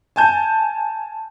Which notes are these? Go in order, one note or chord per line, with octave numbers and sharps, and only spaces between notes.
G#5 A5 G6